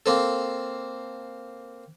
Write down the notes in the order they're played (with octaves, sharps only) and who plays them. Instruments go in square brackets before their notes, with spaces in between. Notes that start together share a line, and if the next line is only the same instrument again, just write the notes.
[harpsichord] A#3 C4 A4